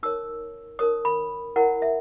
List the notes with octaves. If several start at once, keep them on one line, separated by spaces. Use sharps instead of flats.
D#4 A#4 C#5 E6
D#4 A#4 C#5 D#6
B5
E4 A#4 C#5 F#5
E5